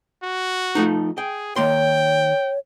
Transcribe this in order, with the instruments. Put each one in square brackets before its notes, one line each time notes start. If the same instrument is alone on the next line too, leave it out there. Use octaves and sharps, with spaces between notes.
[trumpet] F#4
[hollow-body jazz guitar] F3 A3 D#4
[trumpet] G#4 [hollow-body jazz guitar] G5
[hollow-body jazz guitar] D#3 A#3 C6 [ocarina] C#5 [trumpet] G5